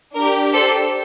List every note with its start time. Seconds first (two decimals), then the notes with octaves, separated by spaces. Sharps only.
0.14 D4 G4 A#4
0.53 A4 C5